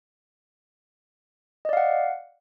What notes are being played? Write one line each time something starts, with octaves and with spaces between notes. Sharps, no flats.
D5 D#5 F5 F#5